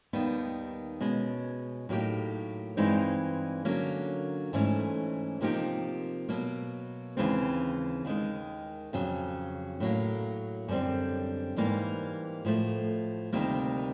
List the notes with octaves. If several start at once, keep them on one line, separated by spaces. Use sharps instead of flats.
D#2 D#3 G3 B3
B2 G#3 C#4
A2 F#3 A#3 D#4 G4
G2 E3 G#3 C4 D#4
D3 F#3 A#3 C#4
G#2 E3 A3 C#4
C3 F3 A#3 D#4 G4
B2 F#3 A#3
D#2 C#3 E3 G#3 C4
D#2 D#3 G#3
F2 C#3 F#3
A2 F#3 A#3
F#2 D3 G3 C4
G#2 E3 G3 A#3
A2 F3 A3
D2 C3 D#3 G3 A#3